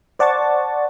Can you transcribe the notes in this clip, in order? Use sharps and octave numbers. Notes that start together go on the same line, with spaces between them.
C5 D5 F#5 A5 C#6 A6